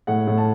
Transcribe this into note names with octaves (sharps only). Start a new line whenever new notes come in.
A2 F#5
A2
A5